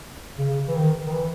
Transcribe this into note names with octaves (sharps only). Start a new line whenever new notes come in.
C#3
E3
D#3
D#3
E3